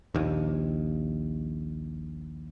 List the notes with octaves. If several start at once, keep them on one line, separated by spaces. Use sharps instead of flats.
A#1 D#2